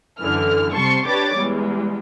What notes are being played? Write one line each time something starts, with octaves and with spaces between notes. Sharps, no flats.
F#2 D3 E3 F6
C3 G3 A5 C6 C#6
D4 G4 B4 C#5 D6 A6
E2 G3 G#3